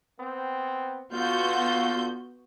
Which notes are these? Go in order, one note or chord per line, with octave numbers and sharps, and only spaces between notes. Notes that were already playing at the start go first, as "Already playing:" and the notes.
B3 C4
D3 B3 F4 F#4 G6